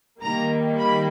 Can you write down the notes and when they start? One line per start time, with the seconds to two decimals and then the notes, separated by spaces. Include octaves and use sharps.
0.22 D#3 G3 A#3 A#5
0.79 B5